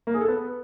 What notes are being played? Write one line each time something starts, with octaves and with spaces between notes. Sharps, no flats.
A#3
G#4
A4
B3